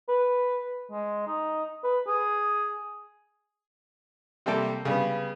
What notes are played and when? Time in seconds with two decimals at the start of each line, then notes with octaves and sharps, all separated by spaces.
0.08 B4
0.91 G#3
1.27 D#4
1.83 B4
2.07 G#4
4.46 C3 G3 A#3 A4 G5
4.85 C#3 G3 B3